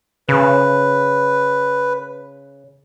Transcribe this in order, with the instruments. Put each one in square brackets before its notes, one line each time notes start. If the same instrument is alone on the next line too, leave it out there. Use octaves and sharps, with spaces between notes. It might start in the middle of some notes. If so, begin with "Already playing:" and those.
[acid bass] C#3 [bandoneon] B4